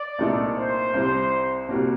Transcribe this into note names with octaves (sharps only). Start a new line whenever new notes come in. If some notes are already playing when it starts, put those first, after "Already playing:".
Already playing: D5
C2 A#2 A3 D#4 A4
C5
C2 C3 G3 C4
C2 C3 G3 A#3 F#4